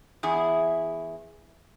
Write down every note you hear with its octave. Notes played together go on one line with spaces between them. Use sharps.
E2 E4 G#4